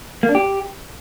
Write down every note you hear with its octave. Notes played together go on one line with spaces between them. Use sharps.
A#3
D4
G4